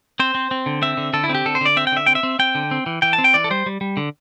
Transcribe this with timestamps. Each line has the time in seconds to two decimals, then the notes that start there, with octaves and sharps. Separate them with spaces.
0.20 C4 C5
0.35 C4
0.51 C4
0.66 D3
0.82 C4 E5
0.97 D3
1.13 D3 A4
1.24 E4
1.29 C4
1.35 G4
1.46 D3 A4
1.55 C5
1.61 D3 D5
1.77 C4 E5
1.87 G5
1.92 D3 E5
2.06 C4 G5
2.15 E5
2.23 C4
2.39 C4 G5
2.55 D3
2.71 C4
2.86 E3
3.02 E3 G5
3.13 A5
3.18 C4
3.24 G5
3.34 E3 D5
3.44 A4
3.50 G3 C5
3.66 G3
3.81 G3
3.97 D3